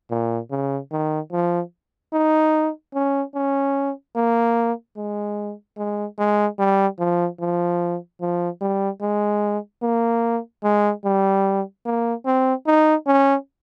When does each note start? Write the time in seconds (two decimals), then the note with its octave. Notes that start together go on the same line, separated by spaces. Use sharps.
0.11 A#2
0.51 C#3
0.92 D#3
1.32 F3
2.13 D#4
2.94 C#4
3.35 C#4
4.16 A#3
4.97 G#3
5.78 G#3
6.18 G#3
6.59 G3
6.99 F3
7.40 F3
8.21 F3
8.61 G3
9.02 G#3
9.82 A#3
10.63 G#3
11.05 G3
11.86 A#3
12.26 C4
12.67 D#4
13.07 C#4